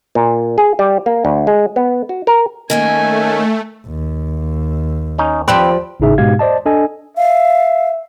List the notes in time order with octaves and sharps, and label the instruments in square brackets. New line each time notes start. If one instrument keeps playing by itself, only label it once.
[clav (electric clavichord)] A#2
G#4
G3
A#3
D2
G#3
B3
F#4
A#4
[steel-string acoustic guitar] D#3 A#3 C#4 [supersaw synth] A3 [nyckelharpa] G#5
[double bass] D#2
[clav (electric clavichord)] C#4 D#4
[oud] F3 G4 D5 [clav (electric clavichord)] C4 B4
[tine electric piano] G#1 A2 C#3 D#4 G#4 E5
G#2 B2 G#3 G4 F5 G#6
C5 D5 D#5 A5
D4 A4 D#5 G#5
[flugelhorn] E5 [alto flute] F5